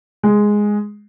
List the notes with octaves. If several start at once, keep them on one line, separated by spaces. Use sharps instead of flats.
G#3